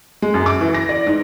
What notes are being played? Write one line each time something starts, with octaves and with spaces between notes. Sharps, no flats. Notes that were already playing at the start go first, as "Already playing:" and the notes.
G#3
F#2
D6
E3
A#6
D5
G#2